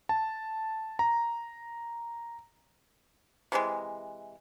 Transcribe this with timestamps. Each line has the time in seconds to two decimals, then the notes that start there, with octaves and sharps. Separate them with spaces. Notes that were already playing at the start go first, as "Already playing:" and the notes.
0.09 A5
0.99 A#5
3.52 C3 E3 F#3 G#3